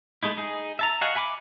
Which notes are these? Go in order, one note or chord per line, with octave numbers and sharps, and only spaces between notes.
G#3 A3 D#4 E4
D#4 G#4
E5 A5 A#5
F#4 D#5 F5 F#5 G#5
E5 G#5 B5 C#6 D6